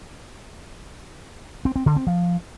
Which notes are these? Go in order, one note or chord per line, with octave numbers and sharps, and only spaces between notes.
C4
C4
D3
C4
F3